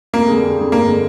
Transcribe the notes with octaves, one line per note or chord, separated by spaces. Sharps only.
F2 A#3
D3 G3 D4 G#4
F2
D3 G3 D4 G#4
G2 A#3
D3 G#3